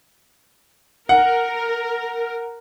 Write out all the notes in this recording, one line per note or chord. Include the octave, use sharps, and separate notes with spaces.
A#4 F#5